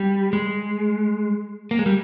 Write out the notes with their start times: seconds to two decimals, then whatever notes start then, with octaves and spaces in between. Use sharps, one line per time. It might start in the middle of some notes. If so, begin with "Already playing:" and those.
Already playing: G3
0.33 G#3
1.71 A#3
1.79 G#3
1.86 G3